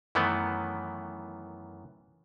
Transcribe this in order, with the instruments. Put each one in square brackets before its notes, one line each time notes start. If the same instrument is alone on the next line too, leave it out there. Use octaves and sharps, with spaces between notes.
[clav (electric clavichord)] F#2 D#3 E3 A3 B3